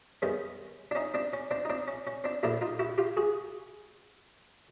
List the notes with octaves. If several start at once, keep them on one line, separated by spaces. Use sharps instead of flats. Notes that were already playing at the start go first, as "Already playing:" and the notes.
G2 D#3 G#3 B3 C#4
D4
C#4 D#4
C4 D4
C#4
C4 D4
D#4
C4 D4
C#4
C#4
C4 D4
A#2 F3 A3 D4 E4
D#4 F4
E4 F#4
F4 G4
F#4 G#4